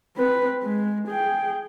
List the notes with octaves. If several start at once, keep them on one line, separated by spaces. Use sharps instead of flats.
C4 B4
G#3
G#4 G5